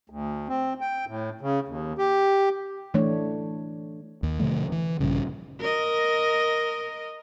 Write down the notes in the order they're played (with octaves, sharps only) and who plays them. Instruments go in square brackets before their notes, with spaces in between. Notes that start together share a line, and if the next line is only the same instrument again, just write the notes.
[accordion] D2
C4
G5
A2
C#3
D#2
G4
[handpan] E3 A3 D4 C#5
[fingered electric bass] D#2
B2 D3 F3 A3
E3
A#1 G2 C#3
[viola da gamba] A#4 D#5